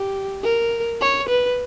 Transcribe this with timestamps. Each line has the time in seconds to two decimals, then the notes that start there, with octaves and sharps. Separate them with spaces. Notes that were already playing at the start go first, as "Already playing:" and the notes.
Already playing: G4
0.44 A#4
1.01 C#5
1.29 B4